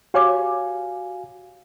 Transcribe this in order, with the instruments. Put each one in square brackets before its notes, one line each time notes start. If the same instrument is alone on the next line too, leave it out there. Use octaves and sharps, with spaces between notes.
[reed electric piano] F#4 F5 G#5 [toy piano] G4 C#5 D6